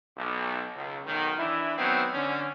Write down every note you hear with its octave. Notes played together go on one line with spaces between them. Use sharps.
B1
C#2
B1 D#3
E3 D4 E4
D#3 F#3 B3 C4
D3 C#4